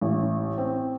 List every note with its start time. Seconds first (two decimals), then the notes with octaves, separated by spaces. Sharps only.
0.01 A1
0.58 C4